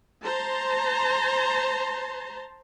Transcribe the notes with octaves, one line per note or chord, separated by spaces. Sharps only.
C5 A5 A#5 C6